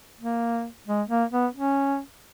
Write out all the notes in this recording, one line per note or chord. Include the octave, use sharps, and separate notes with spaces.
A#3
G#3
A#3
B3
C#4